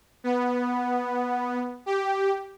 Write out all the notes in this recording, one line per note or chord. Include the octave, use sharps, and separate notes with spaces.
B3
G4